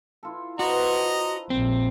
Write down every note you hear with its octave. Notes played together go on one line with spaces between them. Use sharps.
E4 F4 A4
D4 F#4 B4 C5 D#5 A#5
A#1 C4